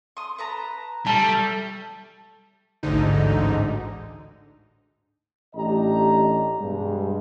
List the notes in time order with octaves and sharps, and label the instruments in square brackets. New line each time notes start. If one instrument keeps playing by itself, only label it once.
[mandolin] C6 D#6
B4 A5 A#5
[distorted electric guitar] G3 [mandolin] A3 [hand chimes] A5
[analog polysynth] A1 D2 G#2 D3 D#4
[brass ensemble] A1 D4 G4 D#5 A#5
G2 B2 G#3